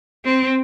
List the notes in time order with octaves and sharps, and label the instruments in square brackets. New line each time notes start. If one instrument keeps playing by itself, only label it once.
[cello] C4